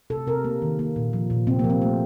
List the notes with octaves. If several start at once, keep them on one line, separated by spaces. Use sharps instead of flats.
C3 A4
C3 A#4
A#3
D#3
A#3
A#2
F3
A#2
C3 C4
F3 A#3
C4
A3